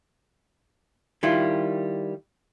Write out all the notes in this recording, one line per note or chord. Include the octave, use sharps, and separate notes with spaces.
D#3 G3 E4 F4